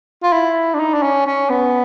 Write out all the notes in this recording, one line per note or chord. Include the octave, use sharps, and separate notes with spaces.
F4
E4
D4
D#4
D4
C#4
C#4
B3